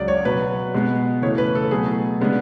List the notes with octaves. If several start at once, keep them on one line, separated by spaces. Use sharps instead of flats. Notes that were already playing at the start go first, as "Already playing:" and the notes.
Already playing: C#2 C#3 F#3 D5
C#5
B2 F#3 B3 B4
B2 G#3 B3
C#3 E3 A3 C#5
B4
A4
B2 F#3 A3 G#4
C#3 G#3 B3 D4